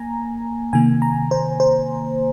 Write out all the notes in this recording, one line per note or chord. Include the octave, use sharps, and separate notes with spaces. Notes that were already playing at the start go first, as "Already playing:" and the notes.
Already playing: A#3 G#5 A#5
C3 D#3 A#3 G#5
A#5
C5
C5